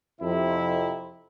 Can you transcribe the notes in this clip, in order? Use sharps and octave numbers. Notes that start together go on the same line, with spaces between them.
F2 C3 E4